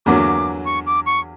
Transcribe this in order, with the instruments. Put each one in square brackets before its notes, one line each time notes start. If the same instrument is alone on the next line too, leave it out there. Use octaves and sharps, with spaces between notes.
[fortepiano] E2 D3 F#3 A#3 [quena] D6
[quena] C#6
D6
C#6